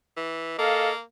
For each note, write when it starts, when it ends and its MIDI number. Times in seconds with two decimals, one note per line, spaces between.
0.17 0.55 52
0.59 1.01 58
0.59 0.93 69
0.59 0.93 75
0.59 0.93 77